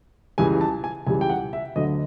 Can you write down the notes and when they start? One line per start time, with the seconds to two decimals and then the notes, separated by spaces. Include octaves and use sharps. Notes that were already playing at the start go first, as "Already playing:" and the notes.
0.38 C#2 C#3 E3 G3 G#5
0.61 A5
0.84 G#5
1.07 C#2 C#3 E3 G3 G#5
1.21 G5
1.29 F#5
1.53 E5
1.76 D2 D3 F#3 D#5